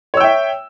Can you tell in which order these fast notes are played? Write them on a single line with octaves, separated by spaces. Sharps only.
C#5 E6 G5 E5